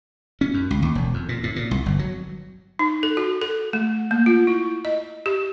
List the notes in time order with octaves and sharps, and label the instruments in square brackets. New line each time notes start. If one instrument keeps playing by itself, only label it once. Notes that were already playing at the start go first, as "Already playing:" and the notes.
[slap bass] C#4
F#2
C#2
D#2
E1
F2
A#2
A2
A#2
C2
G1
F#3
[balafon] D#4
A4
F#4
A4
A3
A#3
F4
E4
D#5
G4